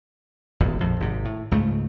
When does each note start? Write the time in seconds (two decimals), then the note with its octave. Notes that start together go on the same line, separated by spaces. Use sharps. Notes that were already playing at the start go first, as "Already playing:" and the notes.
0.60 D#1 G#1 E2
0.80 A#1 F2
1.00 G#1 C3
1.25 A2
1.51 C#2 G#2 C#3 A3